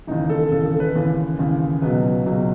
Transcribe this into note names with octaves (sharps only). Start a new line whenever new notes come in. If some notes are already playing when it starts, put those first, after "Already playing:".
D#2 C#3 E3 D#4
A4
D#2 C#3 E3 A4
A4
B4
D#2 C#3 E3
D#2 C#3 E3
C#2 B2 F#3 B4
C#2 B2 F#3